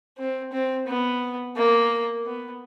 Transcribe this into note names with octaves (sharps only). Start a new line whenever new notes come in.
C4
C4
B3
A#3
B3